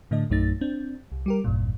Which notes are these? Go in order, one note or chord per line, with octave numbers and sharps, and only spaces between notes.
A2 D3 A3 D4 D#5
A#1 F#2 A3 D#4 A6
C4 D4
C2
G3 G4 A#4
G#1 E2 G2 A#2